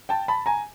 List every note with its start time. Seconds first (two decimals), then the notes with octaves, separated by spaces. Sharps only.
0.09 G5 A5
0.28 A5 B5
0.46 G#5 A#5